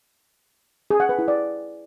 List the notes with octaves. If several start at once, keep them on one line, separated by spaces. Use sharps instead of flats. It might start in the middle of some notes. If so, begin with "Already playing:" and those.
G#4
F#5
B4
E4
D5